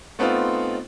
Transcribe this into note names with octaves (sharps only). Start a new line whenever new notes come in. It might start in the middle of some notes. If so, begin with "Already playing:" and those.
A3 B3 C4 D#4 F4